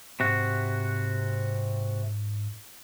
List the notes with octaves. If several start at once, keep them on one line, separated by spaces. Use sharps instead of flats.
G#2 C3 F#4